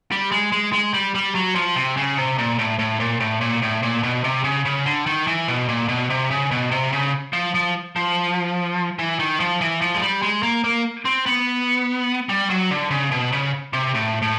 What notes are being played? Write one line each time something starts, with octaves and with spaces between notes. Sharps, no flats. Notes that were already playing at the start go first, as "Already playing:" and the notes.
G3
G#3
G#3
G#3
G3
G3
F#3
F3
C3
C#3
C3
A#2
A2
A2
A#2
A2
A#2
A2
A#2
B2
C3
C#3
C#3
D3
D#3
E3
B2
A#2
B2
C3
C#3
B2
C3
C#3
F3
F3
F3
E3
D#3
F3
E3
F3
G#3
G3
G#3
A#3
A#3
C4
B3
G3
F#3
D3
C#3
B2
C#3
C3
A2
A2